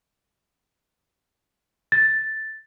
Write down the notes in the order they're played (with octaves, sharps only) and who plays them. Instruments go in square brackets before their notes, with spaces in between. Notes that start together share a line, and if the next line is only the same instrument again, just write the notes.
[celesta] A6